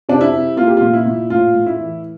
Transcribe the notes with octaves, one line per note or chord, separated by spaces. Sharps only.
C3 D4
E4
C3
A#3 F4
G4
A#2 F4
E4
A#2
A2 F4
A2
E4
E3